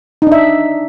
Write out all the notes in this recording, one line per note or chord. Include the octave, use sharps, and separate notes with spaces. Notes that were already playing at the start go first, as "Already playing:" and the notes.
D4 D#4 E5